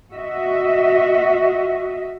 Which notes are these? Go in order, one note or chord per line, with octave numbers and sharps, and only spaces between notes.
F#4 D#5 E5